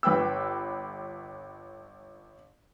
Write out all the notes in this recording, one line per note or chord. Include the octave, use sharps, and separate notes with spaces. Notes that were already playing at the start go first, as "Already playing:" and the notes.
G1 B4 G5 E6